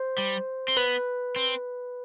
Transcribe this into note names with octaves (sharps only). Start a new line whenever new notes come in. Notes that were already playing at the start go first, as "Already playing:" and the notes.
Already playing: C5
G3
C4
B3 B4
C4